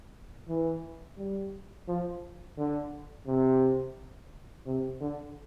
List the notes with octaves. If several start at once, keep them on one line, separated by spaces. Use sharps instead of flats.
E3
G3
F3
D3
C3
C3
D3